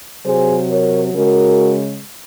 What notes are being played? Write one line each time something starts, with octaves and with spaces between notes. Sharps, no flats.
C3 F#3 G#4 C5
A#4 C#5
C#3 G#3 F#4 A#4